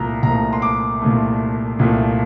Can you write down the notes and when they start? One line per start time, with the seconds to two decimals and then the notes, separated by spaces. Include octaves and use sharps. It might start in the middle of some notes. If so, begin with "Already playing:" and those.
Already playing: C2 A#2 F3 A3 A#5
0.23 C2 A#2 F3 A3 A#5
0.53 C6
0.62 D6
1.01 C2 A#2 F3 A3
1.79 C2 A#2 F3 A3